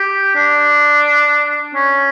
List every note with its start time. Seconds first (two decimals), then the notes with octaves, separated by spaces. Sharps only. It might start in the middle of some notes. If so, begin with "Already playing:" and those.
Already playing: G4
0.35 D4
1.74 C#4